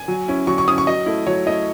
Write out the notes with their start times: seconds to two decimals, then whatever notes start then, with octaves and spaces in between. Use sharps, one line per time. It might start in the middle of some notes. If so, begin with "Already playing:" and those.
Already playing: G#5
0.08 F#3
0.28 C#4 E4
0.47 F#3 C#6
0.58 C#6
0.68 C#4 E4 D#6
0.78 C#6
0.87 F#3 D#5
1.06 A3 E4
1.27 F#3 C#5
1.46 A3 E4 D#5